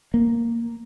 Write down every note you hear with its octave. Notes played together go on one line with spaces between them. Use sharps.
A#3